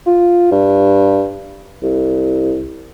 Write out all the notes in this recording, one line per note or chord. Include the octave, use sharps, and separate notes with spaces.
F4
G2
C2